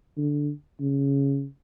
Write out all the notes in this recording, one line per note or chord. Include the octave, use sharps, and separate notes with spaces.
D3
C#3